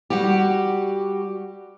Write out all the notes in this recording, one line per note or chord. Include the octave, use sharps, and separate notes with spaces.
G3 F#4 G4